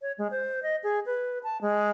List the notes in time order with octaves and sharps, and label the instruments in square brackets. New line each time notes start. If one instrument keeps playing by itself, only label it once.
[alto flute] C#5
G#3
C5
D#5
G#4
B4
A5
G#3